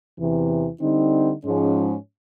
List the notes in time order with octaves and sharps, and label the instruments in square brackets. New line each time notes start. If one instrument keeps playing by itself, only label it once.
[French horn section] E2 C3 E3
D3 G3 C4 D#4
G#2 F3 G#3 C#4